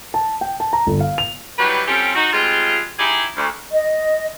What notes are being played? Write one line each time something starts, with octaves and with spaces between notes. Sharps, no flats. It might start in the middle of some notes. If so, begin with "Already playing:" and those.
A5
G5
A5
A#5
G1
F5
F7
E3 F#3 G3 G4 B4
G3 C4 C#4 F4 G4 A4
D#4 F#4
G3 G#3 C4 F4
D#4 E4 G4 G#4
D2
D#5